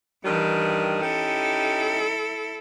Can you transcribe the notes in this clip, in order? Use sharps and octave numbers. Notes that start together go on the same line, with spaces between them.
G2 D#3 E3 G3
C#4 D#4 E4 G4 A4